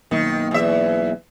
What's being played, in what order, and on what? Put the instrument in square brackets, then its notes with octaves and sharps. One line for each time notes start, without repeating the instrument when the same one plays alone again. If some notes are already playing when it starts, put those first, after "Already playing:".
[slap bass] B1 A#3 [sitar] D#3
[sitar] E2 E5